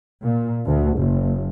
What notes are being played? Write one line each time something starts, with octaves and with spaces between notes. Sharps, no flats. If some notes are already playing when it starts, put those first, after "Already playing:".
A#2
D2
F#1